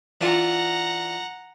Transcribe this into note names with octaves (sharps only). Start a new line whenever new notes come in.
E3 D4 F4 F#5 A#5